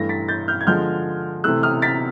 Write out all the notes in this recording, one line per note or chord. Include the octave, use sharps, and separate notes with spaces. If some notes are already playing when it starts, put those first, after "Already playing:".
Already playing: G2 E3 A3 A#6
A6 B6
G6 A6
F6 G6
G#6
D3 F3 G#3 F6 G6
C3 E3 A3 E6 F#6
D#6 F6
A6 B6